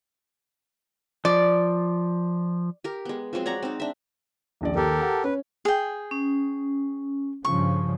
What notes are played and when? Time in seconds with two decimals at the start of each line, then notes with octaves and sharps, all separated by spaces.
1.25 F3 D5
2.84 G4 A#4
3.05 G#3 B3
3.33 F3 F#3 G#3 C4
3.46 C#5 D5 F#5 A#5
3.63 C4 D#4
3.80 D4 E5
4.61 D#1 A#1 D5
4.76 D#2 G4 A4 A#4
5.00 F#5 A5
5.24 C#4 B4
5.65 G#4 G5
6.11 C#4
7.45 G2 C#3 F3 C#6